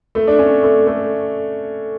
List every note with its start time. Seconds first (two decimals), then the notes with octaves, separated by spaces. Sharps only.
0.15 A3
0.27 D4
0.39 C#4
0.63 A3
0.87 A3